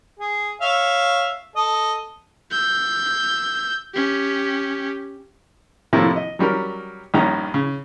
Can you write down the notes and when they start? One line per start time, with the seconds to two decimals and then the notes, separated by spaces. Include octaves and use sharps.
0.19 G#4
0.61 C#5 E5 F5
1.56 A4 D#5
2.51 E6 G6
3.94 C#4 G4
5.93 A2 C3 F3 A3 A#3 E4
6.16 D#5
6.39 F#3 G3 C#4 A#4
7.14 A#1 G2 D#3 A#3 C#4 A#5
7.54 C#3